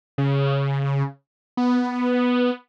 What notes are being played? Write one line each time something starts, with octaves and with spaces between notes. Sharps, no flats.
C#3
B3